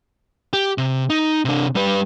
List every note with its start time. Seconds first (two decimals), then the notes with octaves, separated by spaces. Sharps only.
0.53 G4
0.78 C3
1.10 D#4
1.45 C3 D4
1.76 G3 B4